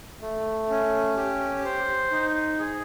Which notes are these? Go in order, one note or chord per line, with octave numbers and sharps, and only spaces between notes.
A3
C#4
G4
C5
D#4
G#4